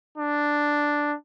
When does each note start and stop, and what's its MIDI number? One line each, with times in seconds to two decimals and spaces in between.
0.18 1.15 62